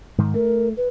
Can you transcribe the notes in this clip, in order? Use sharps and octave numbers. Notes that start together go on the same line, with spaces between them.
G#2 D#3
A3 A#4
B4